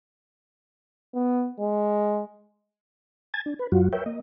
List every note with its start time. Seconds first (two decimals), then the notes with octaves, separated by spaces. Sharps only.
1.15 B3
1.60 G#3
3.34 G#5 A5 G#6 A6
3.46 D4
3.59 B4
3.72 F#2 F#3 F4 F#4
3.93 A#4 B4 C#5 E5 G5
4.06 A#3 D#5